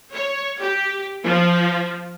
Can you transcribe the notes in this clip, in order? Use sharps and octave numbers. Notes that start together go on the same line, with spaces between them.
C#5
G4
F3